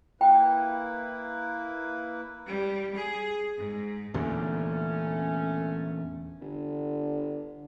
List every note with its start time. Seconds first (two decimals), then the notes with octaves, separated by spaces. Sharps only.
0.21 A#3 E4 B4 G5
2.46 G3
2.95 G#4
3.57 G#2
4.14 E2 A#2 D3 A3 C#4
6.41 G1 D3